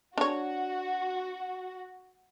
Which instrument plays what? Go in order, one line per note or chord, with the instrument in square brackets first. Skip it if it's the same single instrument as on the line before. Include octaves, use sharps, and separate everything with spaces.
[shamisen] D4 C#5 [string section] F#4